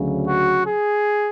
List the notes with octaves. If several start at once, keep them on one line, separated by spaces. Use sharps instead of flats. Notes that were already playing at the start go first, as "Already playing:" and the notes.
Already playing: D2 C#3 F#3
F#4
G#4